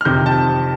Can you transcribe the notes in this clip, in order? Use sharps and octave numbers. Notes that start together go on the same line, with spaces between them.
F6
F2 C3 D#3 G6
A5